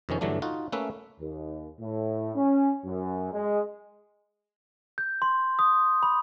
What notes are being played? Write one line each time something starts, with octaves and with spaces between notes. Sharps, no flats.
F2 C3 D#3 C#4
G2 D3 E3 F#3 A3 D4
D#4 F4 F#4
A3 A#3 C#4 B4 E5
D#2
A2
C#4
F#2
G#3
G6
C6
D#6
B5